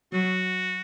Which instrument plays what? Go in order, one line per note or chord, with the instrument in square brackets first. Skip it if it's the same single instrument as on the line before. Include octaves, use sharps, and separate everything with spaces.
[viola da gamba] F#3 [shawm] F#4